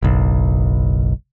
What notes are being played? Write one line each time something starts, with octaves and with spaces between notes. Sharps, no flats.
F#1 B1